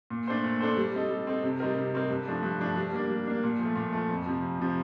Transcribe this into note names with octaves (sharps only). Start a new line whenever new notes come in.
A#2
A3 D4 A4 C5
A#2
A3 D4 A4 C5
G3
C4 D#4 A4
G3
C4 D#4 A4
C3
G3 C4 D#4 A#4
C3
G3 C4 D#4 A#4
G2
F3 A3 D4
G2
F3 A3 D4
G3
A#3 D4
G3
A#3 D4
A#2
F3 A3
A#2
F3 A3
F2
C3 F3
F2
C3 F3